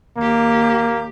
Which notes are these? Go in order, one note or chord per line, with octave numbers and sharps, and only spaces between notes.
D#2 A#3 G4